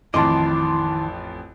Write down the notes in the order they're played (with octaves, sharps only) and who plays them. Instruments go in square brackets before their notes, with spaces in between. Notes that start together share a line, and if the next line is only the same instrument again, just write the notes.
[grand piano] A1 F2 [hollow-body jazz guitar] D#3 D#5 [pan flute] E4 [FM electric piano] A5 C6 D6